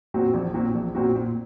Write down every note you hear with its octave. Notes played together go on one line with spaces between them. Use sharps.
A#2 F#3 C4 F#4
A#1
A#2 F#3 C4 F#4
A#1
A#2 F#3 C4 F#4
A#2